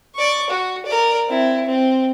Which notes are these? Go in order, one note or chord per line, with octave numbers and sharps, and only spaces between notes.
D5 C#6
F#4
A#4 D5
C4 E4
C4